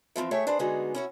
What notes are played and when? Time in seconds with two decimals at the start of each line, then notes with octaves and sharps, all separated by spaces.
0.16 E3 F3 A3 C4
0.31 A3 G#4 C#5 E5 G5
0.47 D4 G#4 B4 C5
0.59 D3 G#3 B3 D#4 F#4 G#4
0.95 C#4 E4 F#4